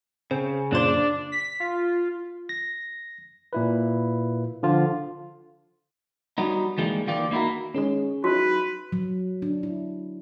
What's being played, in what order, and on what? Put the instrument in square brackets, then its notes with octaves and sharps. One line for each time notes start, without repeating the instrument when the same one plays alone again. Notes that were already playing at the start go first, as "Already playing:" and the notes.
[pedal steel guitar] C#3 [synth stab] C4
[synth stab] F#2 A#2 C5 [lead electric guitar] D4
[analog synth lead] B6
F4
[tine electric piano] A#6
A#2 E4 B4
D3 F3 F4
[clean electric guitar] F#3 G3 B3 D#4
D#3 E3 G3 G#3 A#3
D#3 E3 A#3 F4 G4 D5
A#3 D#4 E4 F#4 A#4
[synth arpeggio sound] D#3 G#3 [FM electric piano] C#4 G#4 C#5
[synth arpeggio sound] F#3 D#4 E4 [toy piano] F#4 [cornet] B4
[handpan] F#3
D4
E4